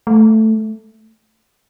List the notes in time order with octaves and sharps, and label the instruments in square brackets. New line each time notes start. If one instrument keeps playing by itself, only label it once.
[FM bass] A3